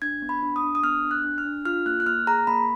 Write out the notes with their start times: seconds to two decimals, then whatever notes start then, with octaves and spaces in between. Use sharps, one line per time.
0.02 D4 G#6
0.22 B3
0.29 B5
0.43 D4
0.56 D#6
0.63 D4
0.75 D#6
0.83 B3 F6
1.04 D4
1.11 F#6
1.24 D4
1.38 F6
1.45 D4
1.65 F4 F6
1.86 A#3 F#6
2.00 F#6
2.06 A#3 F6
2.27 G#4 A#5
2.47 A#3 B5